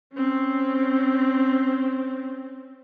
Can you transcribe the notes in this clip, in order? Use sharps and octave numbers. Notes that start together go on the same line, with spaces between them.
C4 C#4